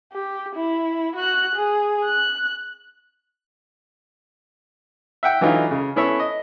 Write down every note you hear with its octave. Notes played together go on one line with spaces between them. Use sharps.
G4
E4
F#4 F#6
G#4
F#6
E5 F#5 G5
D3 E3 F#3 D#4 F4
C#3
B3 C#4 E4 A4 C#5 E5
D#5